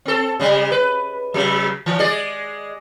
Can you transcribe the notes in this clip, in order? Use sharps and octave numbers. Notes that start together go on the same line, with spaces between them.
C4 A4
C#3 G3 G#3
B4
C#3 F#3
E3
G#3 G#4 D5